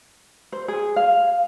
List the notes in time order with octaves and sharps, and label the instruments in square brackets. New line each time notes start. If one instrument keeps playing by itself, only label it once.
[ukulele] C5
G#4
F5